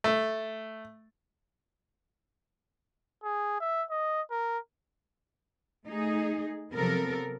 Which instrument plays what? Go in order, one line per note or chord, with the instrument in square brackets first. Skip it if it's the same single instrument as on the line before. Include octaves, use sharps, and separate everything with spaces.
[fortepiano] A3
[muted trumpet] G#4
E5
D#5
A#4
[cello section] A3 D#4 G#4
C3 F3 F#3 B3 A4 A#4